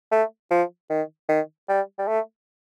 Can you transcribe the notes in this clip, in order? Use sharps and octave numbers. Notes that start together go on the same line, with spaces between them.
A3
F3
D#3
D#3
G3
G3
A3